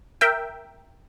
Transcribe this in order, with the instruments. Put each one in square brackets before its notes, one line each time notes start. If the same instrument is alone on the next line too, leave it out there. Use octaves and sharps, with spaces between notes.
[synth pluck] A#4 E5 G5